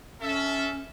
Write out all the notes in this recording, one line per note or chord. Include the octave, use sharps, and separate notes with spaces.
C#4 A4 E5